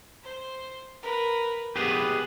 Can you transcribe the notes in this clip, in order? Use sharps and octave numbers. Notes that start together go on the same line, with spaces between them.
C5
A#4 B4
B3 G4 G#4 B4